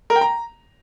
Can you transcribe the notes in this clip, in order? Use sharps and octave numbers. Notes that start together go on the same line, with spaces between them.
A#4
G5
A#5